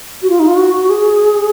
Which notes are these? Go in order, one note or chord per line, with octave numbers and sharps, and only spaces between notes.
F#4
F4
D#4
F4
F#4
G#4